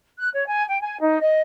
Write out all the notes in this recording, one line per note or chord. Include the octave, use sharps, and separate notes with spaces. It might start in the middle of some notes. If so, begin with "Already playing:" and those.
F#6
C#5
G#5
G5
G#5
D#4
D#5